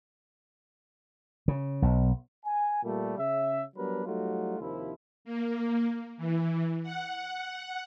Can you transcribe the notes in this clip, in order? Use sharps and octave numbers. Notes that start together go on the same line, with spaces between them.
C#3
B1
G#5
A#2 G3 A3
C#3 E5
F#3 G3 B3 D4 A#4 B4
F#3 G3 A3 D#4 F4 F#4
D#2 C3 D#3 F3 E4
A#3
E3
F#5